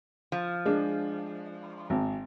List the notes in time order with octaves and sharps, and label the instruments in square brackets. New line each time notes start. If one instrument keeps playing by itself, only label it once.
[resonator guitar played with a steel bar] F3
[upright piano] G#3 D4
[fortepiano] G#1